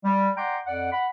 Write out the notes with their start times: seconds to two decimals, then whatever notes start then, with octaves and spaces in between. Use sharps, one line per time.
0.03 G3
0.36 D5 F#5 G5 A#5 C6
0.66 F2 D5 F#5
0.92 F#5 B5